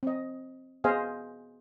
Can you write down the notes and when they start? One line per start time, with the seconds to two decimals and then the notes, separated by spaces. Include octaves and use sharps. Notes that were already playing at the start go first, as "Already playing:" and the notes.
0.03 C4 D#5
0.84 B3 G#4 C5 D#5 F5 G#5